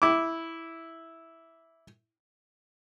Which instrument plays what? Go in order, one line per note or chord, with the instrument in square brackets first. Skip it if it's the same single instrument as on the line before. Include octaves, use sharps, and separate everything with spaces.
[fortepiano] E4 D6